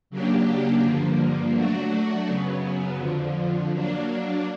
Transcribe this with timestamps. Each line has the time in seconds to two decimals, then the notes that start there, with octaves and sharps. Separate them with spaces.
0.10 C#3 F#3 A#3 D4 G4
0.82 G2 D3 F3 A#3
1.55 F#3 A3 D4 F#4
2.27 F#2 C#3 F#3 B3
2.99 F2 D3 F3
3.72 F#3 A#3 D4